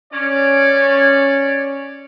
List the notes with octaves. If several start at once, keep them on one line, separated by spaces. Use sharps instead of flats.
C#4 D5